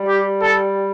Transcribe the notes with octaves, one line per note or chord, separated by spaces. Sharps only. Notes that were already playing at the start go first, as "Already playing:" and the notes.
Already playing: G3
G4
A4